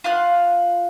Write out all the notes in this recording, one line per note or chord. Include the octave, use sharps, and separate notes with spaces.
F4 F5 F#5 F#6